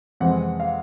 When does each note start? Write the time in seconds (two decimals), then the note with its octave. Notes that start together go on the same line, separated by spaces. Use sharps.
0.20 F2 C3 E3 G#3 C4 F#5
0.60 F5